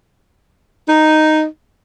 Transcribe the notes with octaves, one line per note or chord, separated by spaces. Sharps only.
D#4